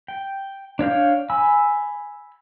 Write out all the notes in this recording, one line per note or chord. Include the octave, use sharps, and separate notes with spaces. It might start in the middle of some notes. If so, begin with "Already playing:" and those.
G5
D4 C#5 F5 G6
G#5 B5 E6